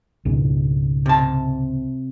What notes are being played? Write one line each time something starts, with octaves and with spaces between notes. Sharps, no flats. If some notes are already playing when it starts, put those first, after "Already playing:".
C#2 G#2 B2
C3 A5